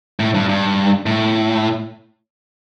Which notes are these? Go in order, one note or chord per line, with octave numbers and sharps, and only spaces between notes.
A2
G2
G2
A2